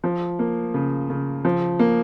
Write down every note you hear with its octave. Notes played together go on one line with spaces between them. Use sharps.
F3
A#3
C#3
C#3
F3
A#3